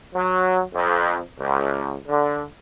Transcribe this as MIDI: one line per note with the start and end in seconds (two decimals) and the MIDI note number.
0.13 0.60 54
0.74 1.18 41
1.40 1.94 37
2.08 2.41 50